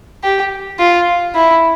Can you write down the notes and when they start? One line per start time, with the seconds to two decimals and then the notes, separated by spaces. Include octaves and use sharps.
0.24 G4
0.80 F4
1.35 E4